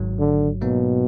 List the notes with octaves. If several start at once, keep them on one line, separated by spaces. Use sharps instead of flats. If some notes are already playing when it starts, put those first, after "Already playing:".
Already playing: G#1 G#2 F#3
D3
G#2 B2 F#3 A#3 D#4